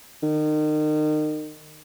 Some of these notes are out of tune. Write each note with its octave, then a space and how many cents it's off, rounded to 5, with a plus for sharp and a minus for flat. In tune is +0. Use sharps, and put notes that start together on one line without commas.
D#3 -30